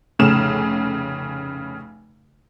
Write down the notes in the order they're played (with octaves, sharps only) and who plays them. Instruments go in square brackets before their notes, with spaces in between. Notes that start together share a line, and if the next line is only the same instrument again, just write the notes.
[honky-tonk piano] F1 A2 C#3 F6 E7